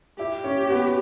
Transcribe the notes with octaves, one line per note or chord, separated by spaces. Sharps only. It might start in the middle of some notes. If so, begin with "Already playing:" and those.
E4 G4
C#4
B3